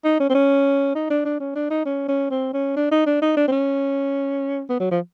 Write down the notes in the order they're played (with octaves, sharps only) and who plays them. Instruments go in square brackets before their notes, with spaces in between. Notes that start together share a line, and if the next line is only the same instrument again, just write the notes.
[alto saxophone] D#4
C#4
C4
C#4
D#4
D4
D4
C#4
D4
D#4
C#4
C#4
C4
C#4
D4
D#4
D4
D#4
D4
C4
C#4
B3
F#3
F3